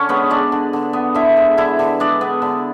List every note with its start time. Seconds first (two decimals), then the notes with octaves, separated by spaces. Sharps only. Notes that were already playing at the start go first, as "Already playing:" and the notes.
Already playing: D3 C#4 C#5
0.09 G#3 B3 B4
0.30 G#3 D4 D5
0.52 D3
0.73 D3
0.93 B3
1.14 D3 E4 E5
1.37 G#3
1.57 D3 E4 E5
1.79 D3
2.00 G#3 D4 D5
2.21 B3
2.42 D3